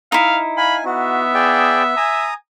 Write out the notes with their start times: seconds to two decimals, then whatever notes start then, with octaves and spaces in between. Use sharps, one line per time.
0.12 D#4 E4 F5
0.57 F5 G#5 B5
0.85 B3 F#4 E5
1.35 G#4 D5 G5
1.97 G#5 A#5 D#6